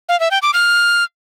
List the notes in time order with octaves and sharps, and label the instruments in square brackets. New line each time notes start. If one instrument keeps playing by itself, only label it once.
[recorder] F5
E5
G5
D6
F6